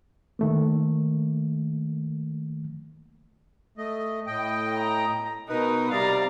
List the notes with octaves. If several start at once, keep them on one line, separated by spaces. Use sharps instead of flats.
D#3 A3 A#3
A3 D#5
A2 D#5 G5
A#5
B2 D#4 A#4 B4 D#6
C3 G3 D5 F5 A#5